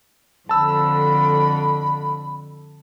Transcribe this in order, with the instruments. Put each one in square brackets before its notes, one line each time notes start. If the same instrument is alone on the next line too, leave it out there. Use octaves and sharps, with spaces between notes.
[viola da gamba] F2 D3 [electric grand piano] A5 E6 [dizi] B5